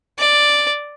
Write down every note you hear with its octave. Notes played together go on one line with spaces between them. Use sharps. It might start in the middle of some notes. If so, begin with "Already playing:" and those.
D5